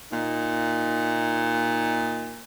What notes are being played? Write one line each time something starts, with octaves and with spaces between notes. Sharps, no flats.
A#2 D#4